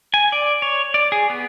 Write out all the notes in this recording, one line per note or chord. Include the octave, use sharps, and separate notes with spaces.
G#5
D5
C#5
D5
G#4
B3